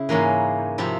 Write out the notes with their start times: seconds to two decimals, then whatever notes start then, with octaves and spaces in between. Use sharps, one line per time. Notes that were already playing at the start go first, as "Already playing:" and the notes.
Already playing: C#3 E4
0.09 G#2 E3 A#3 C#4
0.78 C3 F3 C4 E4